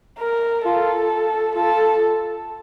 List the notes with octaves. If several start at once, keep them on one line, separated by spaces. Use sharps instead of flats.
A#4
F4 A4
F4 A4